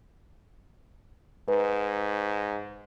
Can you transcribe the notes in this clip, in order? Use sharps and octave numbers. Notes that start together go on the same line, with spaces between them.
G#2 B4